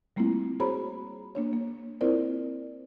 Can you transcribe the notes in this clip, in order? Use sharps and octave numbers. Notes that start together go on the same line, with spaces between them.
G3 A3 A#3 C4 E4 F4
F#4 G#4 C5 C#5 A#5 B5
A#3 D4 C#5
A#3
C4 E4 F4 A#4 C5 D5